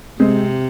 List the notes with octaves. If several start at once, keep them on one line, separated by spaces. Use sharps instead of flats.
C3 G#3 C4